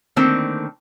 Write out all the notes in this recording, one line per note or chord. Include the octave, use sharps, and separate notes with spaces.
D3 D#3 A3 A#3 C4